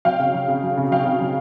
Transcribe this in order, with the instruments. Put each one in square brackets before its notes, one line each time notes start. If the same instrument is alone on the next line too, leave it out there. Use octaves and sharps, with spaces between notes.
[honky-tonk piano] F#3 F5 G5
C#3
F#3
C#3
F#3
C#3
F#3 F5 G5
C#3
F#3